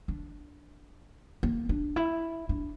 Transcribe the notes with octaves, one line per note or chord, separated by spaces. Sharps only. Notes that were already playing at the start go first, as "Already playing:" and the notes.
D4
A#3
D4
E4
D4